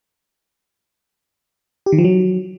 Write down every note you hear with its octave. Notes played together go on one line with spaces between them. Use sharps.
G4
D#3
F3
F#3